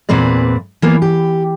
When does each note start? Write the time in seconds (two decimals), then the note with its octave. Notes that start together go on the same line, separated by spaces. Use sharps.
0.09 E2 A#2 E3 C4 B4 D5
0.82 E3 A#3 B3
1.02 G4